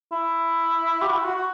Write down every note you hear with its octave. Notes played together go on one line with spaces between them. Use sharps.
E4
G4
F#4
E4
F#4
F#4